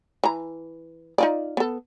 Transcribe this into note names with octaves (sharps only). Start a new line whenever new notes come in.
E3 A#5
D#4 F4 D5
B3 A4